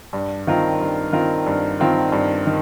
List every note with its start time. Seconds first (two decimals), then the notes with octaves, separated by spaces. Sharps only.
0.13 G2
0.47 D#3 C4 F4 A#4
0.80 G2
1.12 D#3 C4 F4 A#4
1.46 G2
1.80 D#3 C4 F4 A#4
2.12 G2
2.47 D#3